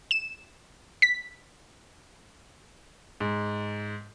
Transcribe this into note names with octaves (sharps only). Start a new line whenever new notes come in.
E7
B6
G#2